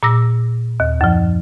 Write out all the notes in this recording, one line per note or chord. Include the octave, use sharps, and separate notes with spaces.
A#2 D6 E6 A#6
D#2
F#2 F3